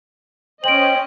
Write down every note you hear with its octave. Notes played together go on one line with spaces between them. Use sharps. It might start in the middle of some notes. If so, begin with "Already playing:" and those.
C#4 C5 D#5 G5 D7 F#7